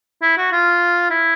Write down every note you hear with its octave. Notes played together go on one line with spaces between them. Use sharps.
E4
F#4
F4
E4